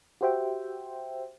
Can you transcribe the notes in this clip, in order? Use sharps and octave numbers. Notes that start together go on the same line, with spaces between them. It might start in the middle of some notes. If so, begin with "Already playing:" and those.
F#4 G4 C5 E5 G5